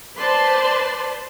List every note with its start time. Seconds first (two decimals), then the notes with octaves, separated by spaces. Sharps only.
0.16 B4 C5 D5 A5 C6